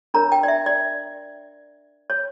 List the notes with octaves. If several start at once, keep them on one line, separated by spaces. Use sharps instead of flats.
D4 A#4 C#5 A#5
G5
D5
E5
D5
C#5